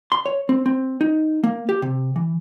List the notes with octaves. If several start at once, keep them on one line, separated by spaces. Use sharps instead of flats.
C6
C#5
C4
C4
D#4
A#3
G4
C3
E3